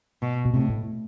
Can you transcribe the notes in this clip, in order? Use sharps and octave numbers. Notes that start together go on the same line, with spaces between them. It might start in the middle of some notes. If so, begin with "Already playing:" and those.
B2
B2
A2 C3
A2